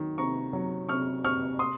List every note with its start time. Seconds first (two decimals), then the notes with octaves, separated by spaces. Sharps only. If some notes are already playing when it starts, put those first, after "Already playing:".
Already playing: D#3 F#3
0.18 C3 A#5 C#6
0.53 F#3
0.89 C3 C#6 F6
1.24 C3 C#6 F6
1.59 C6 D#6